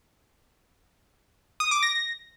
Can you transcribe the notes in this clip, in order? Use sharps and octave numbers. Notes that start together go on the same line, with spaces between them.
D#6
D6
A#6